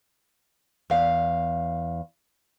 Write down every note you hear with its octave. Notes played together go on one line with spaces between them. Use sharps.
E2 F5